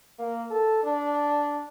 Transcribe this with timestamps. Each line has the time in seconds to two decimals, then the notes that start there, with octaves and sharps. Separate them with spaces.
0.19 A#3
0.51 A4
0.83 D4